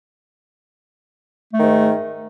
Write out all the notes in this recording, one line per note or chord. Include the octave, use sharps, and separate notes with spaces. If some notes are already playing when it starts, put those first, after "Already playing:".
G#2 D#3 A3